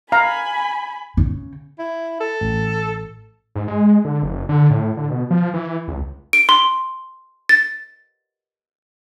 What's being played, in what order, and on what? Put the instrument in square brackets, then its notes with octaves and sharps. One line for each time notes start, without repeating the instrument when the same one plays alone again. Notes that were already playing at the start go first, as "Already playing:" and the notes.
[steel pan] F5 A#5 [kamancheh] G#5 B5
[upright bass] C#3
[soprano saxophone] E4
A4
[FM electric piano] A1
[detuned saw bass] G#2
G#3
D3
F#1
D3
A2
D3
B2
F3
E3
C#2
[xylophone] D7
C6
A6